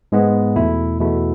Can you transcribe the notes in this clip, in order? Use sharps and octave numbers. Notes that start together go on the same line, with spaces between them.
G#2 G#3 B3
E2 B2 A3 E4
E2 B2 A3 E4